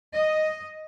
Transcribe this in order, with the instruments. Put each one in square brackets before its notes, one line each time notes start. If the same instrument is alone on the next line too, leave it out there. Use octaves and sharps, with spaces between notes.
[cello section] D#5